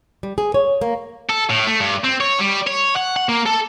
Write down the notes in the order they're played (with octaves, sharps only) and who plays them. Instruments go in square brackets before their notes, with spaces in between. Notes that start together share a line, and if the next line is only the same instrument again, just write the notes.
[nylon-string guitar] G3
G#4
C#5
A#3
[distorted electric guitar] A4
A2
A3
G2
C4
C#5
G3
C#5
F#5
F#5
A#3
A4